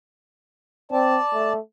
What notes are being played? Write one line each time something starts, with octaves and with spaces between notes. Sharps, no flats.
C4 D5 A5
A3